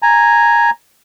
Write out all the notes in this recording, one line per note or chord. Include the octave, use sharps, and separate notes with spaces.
G#5 A#5